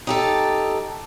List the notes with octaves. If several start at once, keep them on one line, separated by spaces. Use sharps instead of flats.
D#4 G4 A4